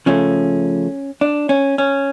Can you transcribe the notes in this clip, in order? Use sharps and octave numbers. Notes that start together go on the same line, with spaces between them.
C#3 F3 A3 C#4
D4
C#4
C#4